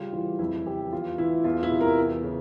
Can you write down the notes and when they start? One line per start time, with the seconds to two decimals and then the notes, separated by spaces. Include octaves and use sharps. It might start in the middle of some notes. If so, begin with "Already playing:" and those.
Already playing: C#3 G3 F4
0.13 E3 F4
0.39 F2 E4
0.65 C#3 G4
0.92 E2 F4
1.18 E3 E4
1.44 E2 F4
1.63 E4
1.71 C3
1.81 A#4
1.98 E2
2.23 C#3